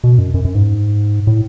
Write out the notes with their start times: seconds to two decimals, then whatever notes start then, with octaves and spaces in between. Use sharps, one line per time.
0.04 B2
0.18 F#2
0.34 F#2
0.45 F#2
0.55 G#2
1.27 A2